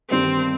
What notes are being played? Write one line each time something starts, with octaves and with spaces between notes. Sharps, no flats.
G1 G2 D#3 G3 C4